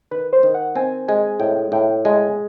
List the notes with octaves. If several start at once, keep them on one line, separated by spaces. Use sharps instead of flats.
D#3 B4
C5
D#3
F#5
C4 G#5
G#3 G#5
A2 G5
A2 G5
G#3 G#5